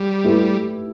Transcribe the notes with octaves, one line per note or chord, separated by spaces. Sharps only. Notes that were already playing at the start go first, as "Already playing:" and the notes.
Already playing: G3
A3 E4 G4 B4